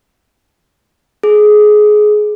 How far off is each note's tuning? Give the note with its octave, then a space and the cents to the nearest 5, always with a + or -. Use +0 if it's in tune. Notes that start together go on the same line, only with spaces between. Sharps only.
G#4 +20